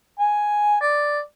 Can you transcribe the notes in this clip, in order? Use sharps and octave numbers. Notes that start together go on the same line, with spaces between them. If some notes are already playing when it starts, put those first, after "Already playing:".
G#5
D5